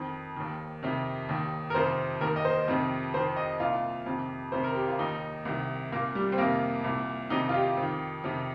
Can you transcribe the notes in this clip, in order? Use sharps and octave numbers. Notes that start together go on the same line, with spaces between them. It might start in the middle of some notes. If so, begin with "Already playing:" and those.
Already playing: F2 D#3
D#2 D#3
F2 C3 D#3
D#2 D#3
A#4
F2 C3 D#3 C5
D#2 D#3 A#4
D#5
C5
F2 C3 D#3
F2 C3 D#3 C5
D#5
C2 A#2 F4
F2 C3 D#3
F2 C3 D#3 C5
A#4
G4
F4
D#2 D#3 D#4
C2 C3 D#3
C2 A#2 A#3
G3
C4
F2 C3 D#3 A#3
C2 A#2
F2 C3 D#3 D#4
F4
G4
F2
D#3
F2 C3 D#3